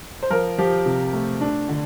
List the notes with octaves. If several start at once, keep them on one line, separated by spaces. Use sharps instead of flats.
C5
F3 A#4
F3 G4
C3
A3
D4
D3